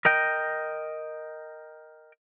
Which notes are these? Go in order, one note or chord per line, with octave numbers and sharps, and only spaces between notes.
A#4 D#5 G5